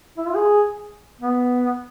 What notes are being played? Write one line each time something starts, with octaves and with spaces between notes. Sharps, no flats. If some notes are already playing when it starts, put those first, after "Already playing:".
E4
F4
G#4
B3